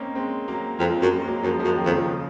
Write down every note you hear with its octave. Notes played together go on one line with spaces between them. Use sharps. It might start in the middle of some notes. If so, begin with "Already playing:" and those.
Already playing: A#3 C4 C#4 D#4
G#3 C4
F#3 A#3
F2 G#3 C4
F#2
A#3
G#3
F#3 A#3
F#2 F3 G#3
F#2 F3 G#3
D#3 F#3
F2
C#3 F3
C#3